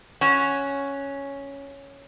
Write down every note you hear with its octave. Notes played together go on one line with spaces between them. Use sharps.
C#4 F#4